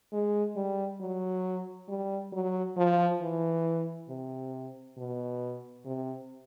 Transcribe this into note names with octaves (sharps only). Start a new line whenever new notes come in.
G#3
G3
F#3
G3
F#3
F3
E3
C3
B2
C3